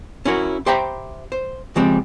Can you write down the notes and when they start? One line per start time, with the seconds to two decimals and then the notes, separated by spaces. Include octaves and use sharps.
0.25 C#4 E4 F#4 A#4
0.66 G4 C5 E5 G5 A#5 B5
1.32 C5
1.76 C#3 F3 G3 G#3 C4 G4